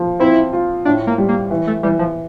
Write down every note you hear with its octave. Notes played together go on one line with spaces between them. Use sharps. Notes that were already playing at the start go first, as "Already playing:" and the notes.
Already playing: F3
C4 E4
F4
A2 D4
A#3
G3
A#3
E3
A3
E3 G3
F3